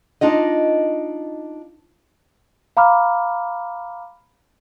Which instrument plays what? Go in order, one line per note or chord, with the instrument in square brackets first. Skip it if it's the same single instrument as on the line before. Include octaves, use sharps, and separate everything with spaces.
[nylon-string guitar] D4 D#4 F4 D#5
[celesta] F5 A#5 B5 D6 F6